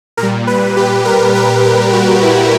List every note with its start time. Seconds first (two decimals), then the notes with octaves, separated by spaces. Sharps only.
0.17 A#2 A#4
0.23 G3
0.47 B4
0.77 G4
1.05 A#4
1.35 B4
1.64 G4
1.93 F#4
2.23 E4